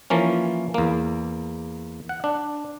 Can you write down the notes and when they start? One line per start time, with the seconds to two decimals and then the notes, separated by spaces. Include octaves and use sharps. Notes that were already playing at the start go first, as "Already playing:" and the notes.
0.10 E3 F3 A#3 C#4
0.74 E2 A#3
2.09 F#5
2.24 D4